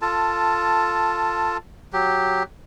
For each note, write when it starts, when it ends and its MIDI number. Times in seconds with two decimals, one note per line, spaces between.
0.02 1.57 65
0.02 1.57 69
0.02 1.57 81
1.93 2.43 54
1.93 2.43 67